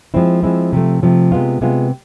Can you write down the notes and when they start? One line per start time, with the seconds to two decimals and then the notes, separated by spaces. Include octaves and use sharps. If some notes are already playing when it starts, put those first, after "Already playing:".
0.14 F3 G#3 C4 E4
0.43 F3 G#3 C4 E4
0.73 C3 F3 A3
1.02 C3 F3 A3
1.32 C3 G#3 B3 F4
1.61 C3 G#3 B3 F4